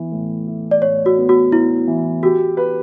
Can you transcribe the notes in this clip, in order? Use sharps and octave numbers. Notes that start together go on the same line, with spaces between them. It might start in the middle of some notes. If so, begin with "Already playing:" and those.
Already playing: E3 B3
A2
E4
D5
A2 C#5
F#4
B3
F#4
B3 E4
E3
F#4 G4
B4